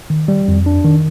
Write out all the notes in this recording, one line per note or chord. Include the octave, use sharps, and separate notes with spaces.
D#3
G3
F2
D4
D#3